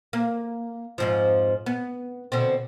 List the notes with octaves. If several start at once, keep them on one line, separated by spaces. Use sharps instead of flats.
A#3
F2 G#2 F3
B3
B2 D3 C4